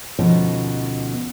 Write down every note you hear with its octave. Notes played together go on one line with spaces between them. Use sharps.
D2 B2 F3 B3 C#4 D#4